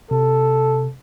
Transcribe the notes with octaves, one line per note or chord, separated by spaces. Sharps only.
C3 A4